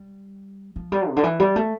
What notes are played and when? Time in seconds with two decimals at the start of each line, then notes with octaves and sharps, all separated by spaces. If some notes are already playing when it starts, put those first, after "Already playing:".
Already playing: G3
0.76 F3
0.92 G3
1.09 C3
1.16 D3
1.23 E3
1.40 G3
1.56 A3